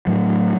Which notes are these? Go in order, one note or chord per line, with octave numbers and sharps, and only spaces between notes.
A2 F#3